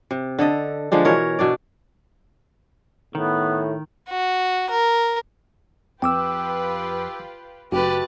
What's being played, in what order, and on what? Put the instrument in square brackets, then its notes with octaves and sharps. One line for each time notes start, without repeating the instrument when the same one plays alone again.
[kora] C3
D3 A4 D#5
D3 F3 G#3 D4
B2 E3 A#4 C#5
B2 D4 D5
[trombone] A2 [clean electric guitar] D#3 [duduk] B3
[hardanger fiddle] F#4
A#4
[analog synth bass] F2 [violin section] F4 G4 B4 [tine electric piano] G5 D6 E6
[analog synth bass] F#1 [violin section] A3 F#6 A6 [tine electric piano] F#4 [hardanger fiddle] G4 B4